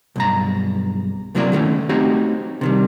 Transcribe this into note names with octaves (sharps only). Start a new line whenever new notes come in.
B1 G2 A#5
C#2 C3 F#3 A#3 E4 D5
D#3 G3 A3 C#4
A3 C4 D#4 F#4 G4 C#5
C3 D#3 G3